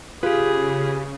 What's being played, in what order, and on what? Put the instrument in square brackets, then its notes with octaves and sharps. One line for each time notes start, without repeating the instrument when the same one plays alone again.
[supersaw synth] C#3 [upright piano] F4 [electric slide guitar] G4 B4 [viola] G#4